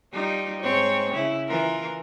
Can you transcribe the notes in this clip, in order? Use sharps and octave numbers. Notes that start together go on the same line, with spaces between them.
G3 D#4 F4
G#2 C4 C#5
C#3 E4
E3 F4 A#4